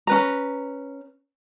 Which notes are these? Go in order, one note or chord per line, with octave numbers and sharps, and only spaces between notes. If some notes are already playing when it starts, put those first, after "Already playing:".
C#4 B4 A#5